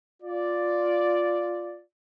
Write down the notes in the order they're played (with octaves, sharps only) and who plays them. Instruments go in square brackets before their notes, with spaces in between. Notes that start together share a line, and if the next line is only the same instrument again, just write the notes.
[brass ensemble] F4 D5